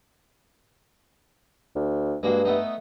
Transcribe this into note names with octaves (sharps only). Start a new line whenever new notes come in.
D2
G2 G#3 A#3 F#4
A3 B3 D#4